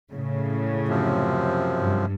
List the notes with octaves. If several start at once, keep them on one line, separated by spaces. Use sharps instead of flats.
A2 C#3
F#2 C3 F3
G2